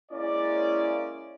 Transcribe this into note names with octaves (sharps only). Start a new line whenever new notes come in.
G#3 A#3 C#4 E4 D5